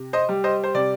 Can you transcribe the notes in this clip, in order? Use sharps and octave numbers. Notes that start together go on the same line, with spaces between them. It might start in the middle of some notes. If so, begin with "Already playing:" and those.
Already playing: C3
C5 D#5
G3
C5 D#5
C5
C3 D5